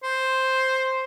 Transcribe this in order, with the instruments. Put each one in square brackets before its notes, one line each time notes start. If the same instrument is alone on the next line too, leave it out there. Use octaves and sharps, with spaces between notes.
[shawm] C5